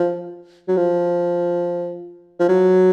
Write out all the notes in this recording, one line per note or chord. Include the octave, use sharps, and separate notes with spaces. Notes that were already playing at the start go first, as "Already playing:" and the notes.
Already playing: F3
F#3
F3
F3
F#3